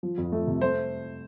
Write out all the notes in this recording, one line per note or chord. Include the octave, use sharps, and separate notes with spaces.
F3
F2
A3
C3
A3 C5